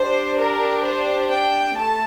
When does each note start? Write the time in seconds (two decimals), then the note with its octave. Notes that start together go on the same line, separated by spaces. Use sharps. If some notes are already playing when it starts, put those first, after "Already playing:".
Already playing: D4 G4 C5
0.38 A#4
0.84 C5
1.31 G5
1.76 A3 A5